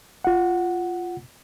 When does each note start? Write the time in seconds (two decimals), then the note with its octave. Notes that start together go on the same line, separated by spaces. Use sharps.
0.25 F4 F#5